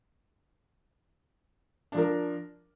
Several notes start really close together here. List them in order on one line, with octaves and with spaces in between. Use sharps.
D4 F3 A#4